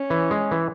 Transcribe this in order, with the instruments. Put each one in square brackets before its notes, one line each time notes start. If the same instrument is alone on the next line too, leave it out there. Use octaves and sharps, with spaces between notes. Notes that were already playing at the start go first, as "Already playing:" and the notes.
Already playing: [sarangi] C#4
[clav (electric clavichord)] E3
G#3
E3